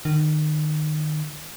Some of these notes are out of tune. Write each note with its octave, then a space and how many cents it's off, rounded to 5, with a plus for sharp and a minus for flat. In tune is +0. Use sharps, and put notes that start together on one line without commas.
D#3 -30